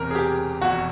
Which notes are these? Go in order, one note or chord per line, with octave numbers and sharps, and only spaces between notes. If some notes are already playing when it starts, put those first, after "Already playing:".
Already playing: E1 E2 C3 A#4
G#4
G4
F1 E2 B2 F#4